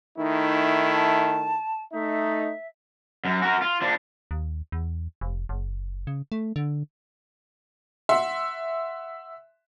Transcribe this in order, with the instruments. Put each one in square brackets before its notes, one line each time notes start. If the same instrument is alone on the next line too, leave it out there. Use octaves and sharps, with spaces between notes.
[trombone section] D#3 A3 E4 [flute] D#4
[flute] A5
[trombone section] A3 D#4 [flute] E5
[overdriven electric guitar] F#2
F#4 A#4
F4
F3 D4
[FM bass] D#2
E2
F1
F#1
C#3
A3
D3
[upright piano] E5 F#5 C6